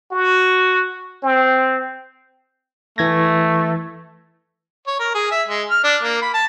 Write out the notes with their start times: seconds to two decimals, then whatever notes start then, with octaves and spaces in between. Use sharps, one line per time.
0.12 F#4
1.23 C4
2.98 E3 A3 G#6 A#6
4.87 C#5
5.00 A#4
5.14 G#4
5.31 E5
5.48 G#3
5.70 F6
5.84 D4
6.03 A#3
6.22 B5
6.34 A5